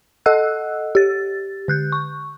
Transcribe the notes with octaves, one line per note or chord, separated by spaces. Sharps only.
A4 D#5 F#5 E6 F#6
G4 A6
D3 F#6 G6
C#6